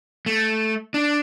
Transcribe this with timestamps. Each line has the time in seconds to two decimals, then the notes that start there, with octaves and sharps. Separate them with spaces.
0.26 A3
0.94 D4